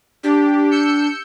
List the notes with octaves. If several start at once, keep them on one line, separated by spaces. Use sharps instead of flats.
D4 G4
E6 G6 C#7